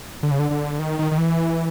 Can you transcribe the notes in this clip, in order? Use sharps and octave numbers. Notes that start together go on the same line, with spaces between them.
D3
C#3
D3
D3
D#3
D#3
D#3
E3